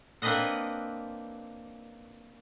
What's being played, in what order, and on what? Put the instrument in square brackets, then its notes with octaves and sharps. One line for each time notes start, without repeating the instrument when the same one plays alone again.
[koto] A#3 C4 D4 B4 D#5 F#5